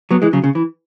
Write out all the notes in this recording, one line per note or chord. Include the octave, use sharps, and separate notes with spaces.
F#3 B3
E3 G#3
C#3 F#3
C#3
E3